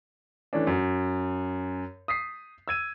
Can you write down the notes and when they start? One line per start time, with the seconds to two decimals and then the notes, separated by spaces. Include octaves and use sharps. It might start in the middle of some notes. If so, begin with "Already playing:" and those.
0.53 E3 A3 C#4 D4
0.67 F#2
2.08 D#6 B6 C7
2.68 E6 G#6 D#7